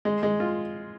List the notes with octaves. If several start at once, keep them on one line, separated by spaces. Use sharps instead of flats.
G#3
G#3
F4